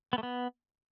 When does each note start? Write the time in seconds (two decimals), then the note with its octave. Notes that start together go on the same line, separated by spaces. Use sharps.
0.13 B3
0.18 A3
0.23 B3